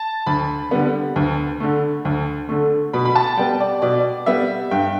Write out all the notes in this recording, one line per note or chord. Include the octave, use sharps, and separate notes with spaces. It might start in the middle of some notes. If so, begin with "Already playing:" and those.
Already playing: A5
D2 B5
D3 G3 B3
D2
D3 A3
D2
D3 A3
B2 B5
B5
A5
G3 B3 G5
D5
B2 D5
G3 B3 E5
G2 G5